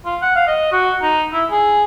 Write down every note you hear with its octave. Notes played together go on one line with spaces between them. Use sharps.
F4
F#5
F5
D#5
F#4
D#4
E4
G#4